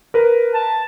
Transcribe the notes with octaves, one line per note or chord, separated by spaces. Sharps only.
A#4 B4
A5